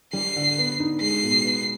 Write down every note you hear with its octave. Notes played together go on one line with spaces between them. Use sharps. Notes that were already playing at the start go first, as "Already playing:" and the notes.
G3 C7
D3
B3
D#4
G#3 C7
B2
B3